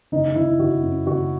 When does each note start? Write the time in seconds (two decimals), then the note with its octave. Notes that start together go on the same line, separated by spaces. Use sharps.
0.12 F#1 D#4
0.35 F#1 E4
0.59 F#1 F#4
0.83 F#2
1.07 F#1 F#4